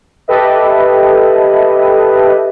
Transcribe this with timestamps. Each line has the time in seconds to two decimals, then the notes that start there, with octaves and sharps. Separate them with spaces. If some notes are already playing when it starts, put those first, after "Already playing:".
0.28 G4 A4 B4 D#5 E5